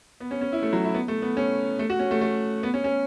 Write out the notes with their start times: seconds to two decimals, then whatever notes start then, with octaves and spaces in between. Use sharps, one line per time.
0.20 B3
0.31 C#4
0.41 C#4
0.52 E4
0.62 A3
0.73 F#3
0.84 E4
0.94 B3
1.08 A3
1.22 B3
1.37 C#4
1.79 A3
1.90 F#4
1.99 C#4
2.11 A3
2.21 A3
2.63 B3
2.74 C#4
2.84 C#4